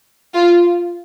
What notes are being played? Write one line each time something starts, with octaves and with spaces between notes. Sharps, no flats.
F4